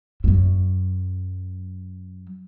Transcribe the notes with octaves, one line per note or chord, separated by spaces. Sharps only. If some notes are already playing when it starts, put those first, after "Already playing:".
F#2 F#3